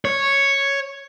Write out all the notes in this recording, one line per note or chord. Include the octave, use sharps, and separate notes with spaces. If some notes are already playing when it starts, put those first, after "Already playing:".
C#5